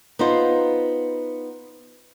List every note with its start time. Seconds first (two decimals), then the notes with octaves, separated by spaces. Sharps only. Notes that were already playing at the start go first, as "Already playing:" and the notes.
0.19 B3 D#4 F4 C5